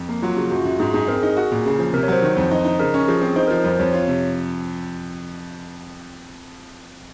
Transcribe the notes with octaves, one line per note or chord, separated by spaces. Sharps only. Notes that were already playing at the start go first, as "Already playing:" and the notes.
Already playing: F2
A#3
F#3 F4
C#3 F#4
F#2 F#4
F4
F#2 F#4
G#2 G#4
G#2 G#4
C4 A#4
D#4 G#4
F#4
A#2
C#3
F3
C3 A#4
C#5
F#3 C5
D#3
F2
D#4 C5
D#4
C#3 A#4
C#4
F3 G#4
C4
D#4 C5
A#4
F3 C5
F2 C5
F2 C#5
F4 C#5
C3